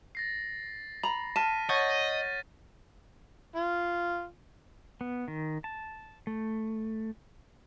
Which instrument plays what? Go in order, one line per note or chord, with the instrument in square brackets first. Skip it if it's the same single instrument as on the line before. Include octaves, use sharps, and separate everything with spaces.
[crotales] A6 A#6 C7
[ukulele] A#5 [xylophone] B5
[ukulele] A5 [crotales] F6 B6 D#7
[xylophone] C#5 F#5 C#6 [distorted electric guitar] D#5 [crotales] G6 A6 A#6
[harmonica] F4
[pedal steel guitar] B3
D#3
A5
A3